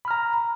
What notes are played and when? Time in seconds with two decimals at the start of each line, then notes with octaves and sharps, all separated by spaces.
0.05 B5
0.08 F6
0.11 A#5